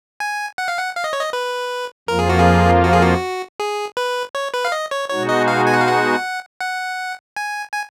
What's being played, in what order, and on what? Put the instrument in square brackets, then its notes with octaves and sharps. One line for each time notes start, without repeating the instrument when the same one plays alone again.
[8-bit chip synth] G#5
F#5
F5
F#5
F5
D#5
C#5
D#5
B4
[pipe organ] F2 F3 A#3 F4 [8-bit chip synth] A#4
[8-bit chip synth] G#4
F#4
G#4
F#4
G#4
F#4
G#4
B4
C#5
B4
F5
D#5
C#5
[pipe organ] B2 G#3 D#4 F#4 [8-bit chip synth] C#5
[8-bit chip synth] D#5
F5
G#5
F#5
F5
F#5
F#5
G#5
G#5